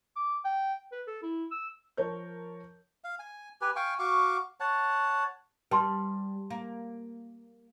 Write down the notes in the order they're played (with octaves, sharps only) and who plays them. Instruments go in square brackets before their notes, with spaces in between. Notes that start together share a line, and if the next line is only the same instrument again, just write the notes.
[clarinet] D6
G5
B4
A4
E4
E6
[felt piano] F3 A#4 C#5 A5 G6
[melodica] F5
G#5
G4 B4 G#5
F5 G5 G#5 C#6
F#4 F5 C#6 D6
C#5 F#5 A5
[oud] G3 [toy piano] B4 A5 C6
[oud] A#3